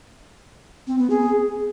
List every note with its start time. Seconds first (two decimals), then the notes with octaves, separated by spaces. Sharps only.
0.87 C4
0.98 B3
1.10 G#4